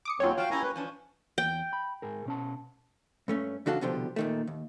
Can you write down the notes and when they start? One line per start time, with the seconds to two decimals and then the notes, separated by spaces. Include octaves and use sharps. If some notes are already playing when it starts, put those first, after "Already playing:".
0.05 D6 D#6 C#7
0.20 D#2 F#3 G#3 C4 C#4 F4 G4 C#5
0.37 F3 F#4 F5 G5
0.51 A#3 C#4 E4 G4 G#5 A#5
0.63 B4
0.76 E3 F3 C#4 D4
1.38 E2 G5
1.73 B5
2.02 G#2 G#4 A#4
2.26 B2 C#4 A5
3.28 G2 A3 C#4
3.66 E2 C#3 D4 F#4 A4 F5
3.81 C2 B2 D3 F3 G4
4.16 A#2 D#3 A3
4.47 D#2